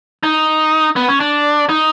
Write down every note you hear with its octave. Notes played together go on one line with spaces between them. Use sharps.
D#4
B3
C#4
D4
D#4